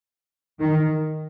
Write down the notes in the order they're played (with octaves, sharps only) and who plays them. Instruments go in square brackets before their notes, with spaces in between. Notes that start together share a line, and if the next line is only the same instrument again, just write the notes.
[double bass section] D#3